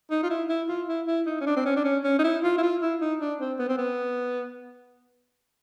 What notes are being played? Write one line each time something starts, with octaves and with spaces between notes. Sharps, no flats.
D#4
F4
E4
E4
F4
E4
E4
D#4
C#4
D4
C4
C#4
D4
C#4
C#4
D#4
E4
F4
E4
F4
E4
D#4
D4
C4
B3
C4
B3